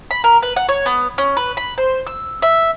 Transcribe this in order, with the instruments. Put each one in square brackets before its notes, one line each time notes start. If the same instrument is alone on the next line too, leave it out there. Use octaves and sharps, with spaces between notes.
[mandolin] B5
A#4
B4
F#5
C#5
B3
C#4
B4
B5
C5
E6
E5